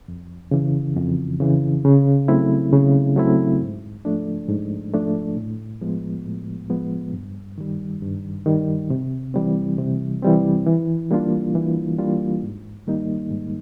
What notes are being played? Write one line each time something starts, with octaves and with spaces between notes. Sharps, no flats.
F2
C#3 E3
F2
C#3 E3
C#3
F#3 A3 C4 E4
C#3
F#3 A3 C4 E4
G#2
F3 A3 D4
G#2
F3 A3 D4
A2
F3 G#3 B3
A2
F3 G#3 B3
G2
D#3 G3
G2
D#3 G3
C3
E3 G3 C4
C3
E3 G3 C4
E3
G3 A#3 D4 F4
E3
G3 A#3 D4 F4
G#2
D#3 G3 A#3 D#4
G#2